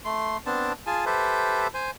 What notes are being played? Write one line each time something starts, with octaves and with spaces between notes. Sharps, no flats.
A3 C6
B3 C4 D4 A5
F4 G#4 G#5 A5
G4 A4 B4 C5 E5
C5 G#5